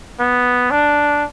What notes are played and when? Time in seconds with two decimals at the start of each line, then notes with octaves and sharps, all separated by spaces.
0.20 B3
0.71 D4